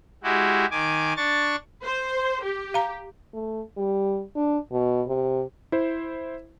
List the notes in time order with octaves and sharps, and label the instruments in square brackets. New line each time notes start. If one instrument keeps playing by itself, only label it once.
[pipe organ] G#3 E4 F#4 G4
D#3 G#5 D6
D4 C#6 A6
[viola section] C5
G4
[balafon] F5 A#5
[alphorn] A3
G3
D4
B2
C3
[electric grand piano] E4 C5